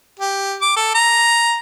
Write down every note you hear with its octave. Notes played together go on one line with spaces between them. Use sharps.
G4
D6
A4
A#5